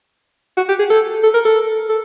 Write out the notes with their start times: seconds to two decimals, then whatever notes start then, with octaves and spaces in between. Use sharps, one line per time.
0.57 F#4
0.69 G4
0.79 G#4
0.90 A4
1.23 A4
1.34 A#4
1.45 A4
1.89 A4